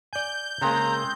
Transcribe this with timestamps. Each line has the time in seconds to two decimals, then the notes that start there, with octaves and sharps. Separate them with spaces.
0.13 D5 G#5 G6
0.62 C#3 G#3 A#3 C4 A#5